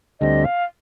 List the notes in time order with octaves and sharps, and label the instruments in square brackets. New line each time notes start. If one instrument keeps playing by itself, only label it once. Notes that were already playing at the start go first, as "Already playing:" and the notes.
[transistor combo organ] D2 D3 G3 C4 [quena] D#5
[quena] F5